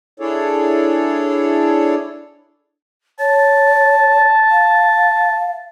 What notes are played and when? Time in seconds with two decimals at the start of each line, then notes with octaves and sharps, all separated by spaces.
0.20 D4 E4 G#4 A4 C#5 D5
3.19 C#5 A5
4.51 F5